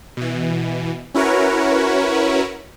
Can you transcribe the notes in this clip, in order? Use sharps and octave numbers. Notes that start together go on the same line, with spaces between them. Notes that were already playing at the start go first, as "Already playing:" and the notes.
B2 E3
C#4 E4 F#4 A#4 B4 C#5